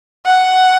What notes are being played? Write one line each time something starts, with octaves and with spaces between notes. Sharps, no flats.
F#5